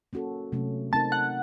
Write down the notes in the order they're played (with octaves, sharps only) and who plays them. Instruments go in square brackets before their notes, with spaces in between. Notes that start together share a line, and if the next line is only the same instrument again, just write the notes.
[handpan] A#3 C#4 F#4 A4
C3 F#3 A3 C#4
[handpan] A3 C4 D#4 A#4 [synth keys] A5
[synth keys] F#5